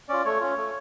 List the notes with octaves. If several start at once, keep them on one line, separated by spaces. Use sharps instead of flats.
C#4 F4 D5
A3 C#5
C#4 F4
A3